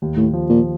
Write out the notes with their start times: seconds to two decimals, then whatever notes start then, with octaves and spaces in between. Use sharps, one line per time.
0.02 D#2
0.17 A2
0.33 F3
0.49 A#2